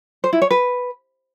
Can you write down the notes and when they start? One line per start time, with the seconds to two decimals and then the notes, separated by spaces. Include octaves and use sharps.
0.24 C5
0.33 E4
0.42 C#5
0.51 B4